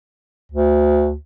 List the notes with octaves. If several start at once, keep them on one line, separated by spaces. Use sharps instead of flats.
D2